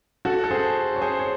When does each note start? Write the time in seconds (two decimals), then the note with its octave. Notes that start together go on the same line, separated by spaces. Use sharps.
0.25 F#4 A4
0.44 A4
0.51 G#4 C5
0.96 C#5
1.01 G#4 C5
1.19 C#5